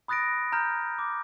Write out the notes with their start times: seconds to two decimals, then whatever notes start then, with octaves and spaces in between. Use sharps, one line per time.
0.08 B5 D#6 F#6 A6 A#6 D7
0.52 A#5 F6 G6
0.99 D6